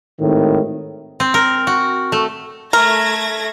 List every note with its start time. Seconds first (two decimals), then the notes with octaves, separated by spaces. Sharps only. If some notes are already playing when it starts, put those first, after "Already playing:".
0.20 G#1 A2 D#3
1.20 C4
1.34 A#4
1.67 F#4
2.12 A3
2.73 A3 A#4 G#6 A#6